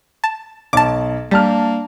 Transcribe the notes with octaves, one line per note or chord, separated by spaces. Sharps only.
A5
B1 A5 D6
G3 A#3 D4 A5 F6